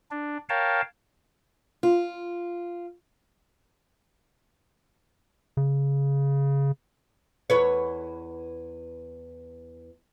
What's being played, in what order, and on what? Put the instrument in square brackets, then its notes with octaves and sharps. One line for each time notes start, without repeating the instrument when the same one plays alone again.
[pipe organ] D4
A#4 C#5 F5 G5 A5
[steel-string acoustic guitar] F4
[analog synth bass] C#3
[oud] E2 B4 C#5